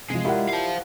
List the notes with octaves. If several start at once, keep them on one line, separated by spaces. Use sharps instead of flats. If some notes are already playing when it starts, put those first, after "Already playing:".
C3 F3 G#3
E4 F4 G4 A#4 D5 F#5
C5 F5